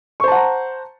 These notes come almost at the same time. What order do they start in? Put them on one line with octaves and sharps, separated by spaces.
C#6 C5 A5 F#5 A#5